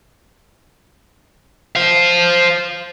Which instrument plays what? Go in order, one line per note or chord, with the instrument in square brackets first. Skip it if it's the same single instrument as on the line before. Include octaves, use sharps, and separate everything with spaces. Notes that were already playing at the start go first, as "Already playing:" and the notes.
[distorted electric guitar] C5 F5